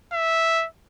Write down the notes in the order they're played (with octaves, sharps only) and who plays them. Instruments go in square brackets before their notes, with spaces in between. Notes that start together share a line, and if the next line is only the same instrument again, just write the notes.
[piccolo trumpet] E5